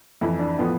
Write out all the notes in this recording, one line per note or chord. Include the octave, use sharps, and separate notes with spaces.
F2 E3 E4
D4
A2 F3 B3